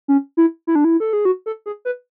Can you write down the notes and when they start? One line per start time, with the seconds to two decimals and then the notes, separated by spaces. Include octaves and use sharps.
0.08 C#4
0.37 E4
0.67 E4
0.75 D4
0.84 E4
1.00 A4
1.13 G#4
1.25 F#4
1.46 A4
1.66 G#4
1.85 B4